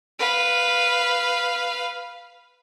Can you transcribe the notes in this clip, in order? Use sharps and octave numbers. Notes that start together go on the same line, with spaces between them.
B4 F5